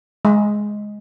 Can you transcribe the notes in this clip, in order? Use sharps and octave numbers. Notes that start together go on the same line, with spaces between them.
G#3